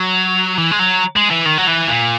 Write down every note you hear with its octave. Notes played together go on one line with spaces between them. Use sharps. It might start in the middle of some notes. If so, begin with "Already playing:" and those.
Already playing: F#3
E3
G#3
F#3
G#3
E3
D#3
F#3
E3
A#2